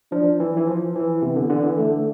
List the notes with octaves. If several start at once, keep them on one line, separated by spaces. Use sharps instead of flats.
F3 D4
E3
E3
F3
E3
C3 B3
D3
E3
D3
D3
E3
D3 A3